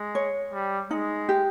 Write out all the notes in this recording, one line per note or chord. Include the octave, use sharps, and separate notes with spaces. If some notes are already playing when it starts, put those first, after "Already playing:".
Already playing: G#3
C#5
G3
G#3 D#4
G4